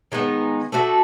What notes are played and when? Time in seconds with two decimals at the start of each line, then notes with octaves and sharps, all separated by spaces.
0.12 D#3 G#3 B3 D#4
0.72 A3 D4 F#4 A4